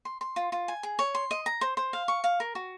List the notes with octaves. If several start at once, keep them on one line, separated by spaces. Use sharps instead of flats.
C6
C6
F4
F4
G#5
G#4
C#5
C6
D#5
A#5
C5
C5
F5
C#6
F5
A#4
F#4